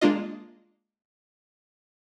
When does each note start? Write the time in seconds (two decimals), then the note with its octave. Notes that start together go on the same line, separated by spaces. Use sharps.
0.01 G#3 A#3 D4 F4 D#5